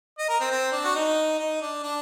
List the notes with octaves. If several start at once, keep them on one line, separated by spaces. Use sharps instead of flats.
D#5
A#4
C4
C4
D4
F#4
D#4
D#4
D4
D4